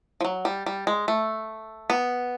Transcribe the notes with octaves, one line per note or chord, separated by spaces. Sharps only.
F3
F#3
G3
G3
G#3
A3
B3